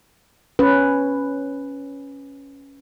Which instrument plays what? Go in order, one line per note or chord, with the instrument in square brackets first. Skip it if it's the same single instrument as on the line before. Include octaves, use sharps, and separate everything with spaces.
[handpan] C#4 B4